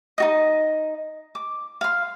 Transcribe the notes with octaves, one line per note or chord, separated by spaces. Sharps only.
D#4 F#4 D#5
D6
F5 C6